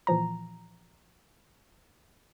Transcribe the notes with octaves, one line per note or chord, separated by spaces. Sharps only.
A#2 E3 F3 A#5